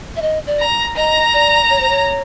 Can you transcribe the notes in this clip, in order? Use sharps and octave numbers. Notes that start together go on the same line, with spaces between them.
E5
D#5
D5
A#5
D#5 A#5
D5
C#5
C5
C#5